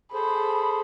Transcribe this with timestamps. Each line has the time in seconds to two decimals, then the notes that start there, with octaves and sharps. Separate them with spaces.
0.13 G#4 A4 C5 B5